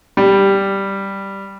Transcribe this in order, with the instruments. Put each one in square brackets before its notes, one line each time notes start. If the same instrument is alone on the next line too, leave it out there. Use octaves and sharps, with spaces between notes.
[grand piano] G3